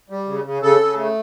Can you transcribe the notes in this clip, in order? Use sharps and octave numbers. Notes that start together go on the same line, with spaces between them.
G3
C#3
C#3
C#3 A4
C#3
A3